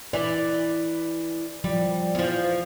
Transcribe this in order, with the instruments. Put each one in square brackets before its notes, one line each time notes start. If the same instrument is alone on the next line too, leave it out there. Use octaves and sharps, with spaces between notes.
[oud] E3 [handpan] D5
[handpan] F3 [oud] G3
[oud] E2 F3 [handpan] B3